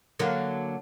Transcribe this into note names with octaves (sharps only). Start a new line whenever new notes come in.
D3 F#3 A#3